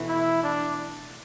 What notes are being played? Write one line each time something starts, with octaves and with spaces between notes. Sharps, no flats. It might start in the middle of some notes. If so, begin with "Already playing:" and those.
Already playing: B2 E3 A3
E4
D4